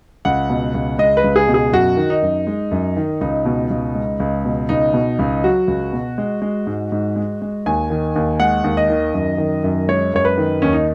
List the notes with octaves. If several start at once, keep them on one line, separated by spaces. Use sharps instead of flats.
C#2 F#5
B2
C#2
G#3 D#5
B4
C#2
G#4
B2
G#4
F#2 F#4
D#3
D#4
F#2
G#3
F#2
D#3
C#2 D#4
B2
C#2
G#3
C#2
B2
C#2 D#4
B2
C#2
F#3 F#4
C#2
B2
G#3
G#3
G#2
G#2
G#3
G#3
D#2 G#5
D#3
D#2
G#3 F#5
D#2
D#5
D#3
F#2
D#3
F#2
G#3 C#5
F#2 C#5
B4
D#3
D#2 C#4
D#4